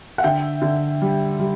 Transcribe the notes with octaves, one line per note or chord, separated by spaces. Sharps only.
F#5
D3 E5 G5
D3
G3
G3